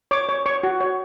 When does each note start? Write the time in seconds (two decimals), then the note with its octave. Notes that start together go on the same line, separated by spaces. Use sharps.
0.11 C#5 D6
0.29 C#5
0.46 C#5 C#6
0.63 F#4
0.81 C#5